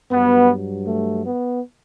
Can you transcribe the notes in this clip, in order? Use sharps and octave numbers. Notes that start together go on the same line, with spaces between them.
G2 F#3 B3
A3
B3